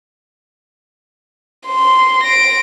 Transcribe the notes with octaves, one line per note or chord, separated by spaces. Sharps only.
C6
A#6 D7